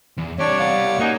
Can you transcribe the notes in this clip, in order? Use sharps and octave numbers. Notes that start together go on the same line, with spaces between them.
E2
C2 D4 G4 C#5 D5
B3 D5 F5
A#3 C#4 D#4 F#4